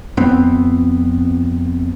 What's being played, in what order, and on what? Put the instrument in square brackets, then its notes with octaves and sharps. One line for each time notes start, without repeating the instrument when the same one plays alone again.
[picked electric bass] F2 B3 C4